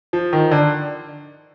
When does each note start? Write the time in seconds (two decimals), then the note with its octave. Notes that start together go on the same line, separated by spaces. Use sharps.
0.13 F3
0.33 D#3
0.51 D3